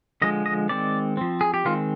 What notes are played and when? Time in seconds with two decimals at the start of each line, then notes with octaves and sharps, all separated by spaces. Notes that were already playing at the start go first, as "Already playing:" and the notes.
0.22 D3 F3 G#3 D#5
0.46 D#5
0.69 D#3 G#3 C4 D5
1.17 F3 C4
1.41 G#4
1.54 G4
1.65 D#3 G#3 C4 F4